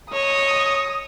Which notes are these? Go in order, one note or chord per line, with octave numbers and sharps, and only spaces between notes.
C#5 D#5 D#6